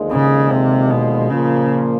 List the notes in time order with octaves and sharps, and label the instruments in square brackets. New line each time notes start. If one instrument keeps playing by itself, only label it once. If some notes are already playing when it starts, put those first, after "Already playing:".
Already playing: [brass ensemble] D#2 D3 F3 G#3
[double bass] C#3
C3
B2
[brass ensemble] A#2 F3 A#3 [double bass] C#3